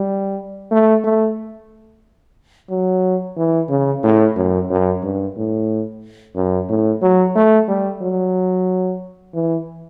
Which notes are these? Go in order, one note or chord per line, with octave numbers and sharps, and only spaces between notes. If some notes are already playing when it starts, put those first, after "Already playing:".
Already playing: G3
A3
A3
F#3
E3
C#3
A2
F#2
F#2
G2
A2
F#2
A2
F#3
A3
G3
F#3
E3